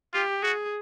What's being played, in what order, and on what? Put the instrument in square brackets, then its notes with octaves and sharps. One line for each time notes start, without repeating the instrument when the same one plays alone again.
[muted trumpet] F4 [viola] G4
[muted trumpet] F#4 [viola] G#4